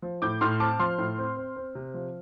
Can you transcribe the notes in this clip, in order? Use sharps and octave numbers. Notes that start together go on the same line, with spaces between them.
F3
A2 D6 G6
A2 C6 F6
C4 A5 D6
F3 C6 F6
A2
C4
C4
C4
C3
F3